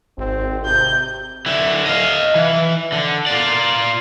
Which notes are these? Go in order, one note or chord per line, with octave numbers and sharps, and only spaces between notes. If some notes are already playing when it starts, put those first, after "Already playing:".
G#1 C4
C3 G6
D3 E4
D#5 F5
E3
D3
F4 D5